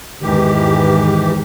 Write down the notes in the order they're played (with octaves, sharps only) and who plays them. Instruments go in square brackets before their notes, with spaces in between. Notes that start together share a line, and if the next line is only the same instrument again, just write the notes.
[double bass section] E2 G#2 D#3 [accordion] E3 G4